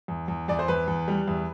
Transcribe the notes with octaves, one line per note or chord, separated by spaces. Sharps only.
E2
E2
E2 D5
C5
E2 B4
E2
G3
E2